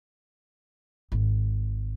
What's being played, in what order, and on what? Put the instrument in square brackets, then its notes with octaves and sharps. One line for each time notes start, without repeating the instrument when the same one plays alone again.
[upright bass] G#1